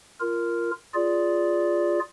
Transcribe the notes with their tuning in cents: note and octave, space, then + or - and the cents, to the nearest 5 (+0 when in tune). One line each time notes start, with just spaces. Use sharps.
F4 -15 A#4 +0
F4 +0 G#4 +0 D5 -10